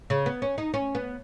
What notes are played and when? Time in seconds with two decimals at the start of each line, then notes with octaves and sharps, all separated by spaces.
0.10 C#3
0.26 B3
0.42 C#4
0.58 D#4
0.74 C#4
0.95 B3